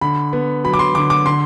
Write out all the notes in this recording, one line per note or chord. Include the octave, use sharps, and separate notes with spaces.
D3 B5
B3
F#3 B5
D6
C6
D3 D6
D6
D3 C6